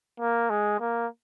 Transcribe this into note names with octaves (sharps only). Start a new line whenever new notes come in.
A#3
G#3
A#3